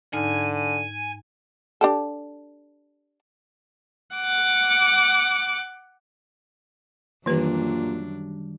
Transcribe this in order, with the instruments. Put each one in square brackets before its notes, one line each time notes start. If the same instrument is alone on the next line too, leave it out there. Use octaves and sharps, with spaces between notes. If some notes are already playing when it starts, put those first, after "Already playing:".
[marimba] G#2 D#4 F6 [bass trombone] D3 [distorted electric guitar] G#5
[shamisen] D4 G4 A4
[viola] F#5 D6
[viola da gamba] F#2 D4 [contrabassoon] A#2 [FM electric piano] D#3 G3 [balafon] E3 B4